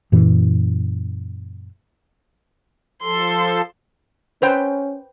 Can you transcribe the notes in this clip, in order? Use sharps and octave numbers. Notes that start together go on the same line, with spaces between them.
F#2 A#2 E3
F3 A4 C6
C#4 B4 C5 G5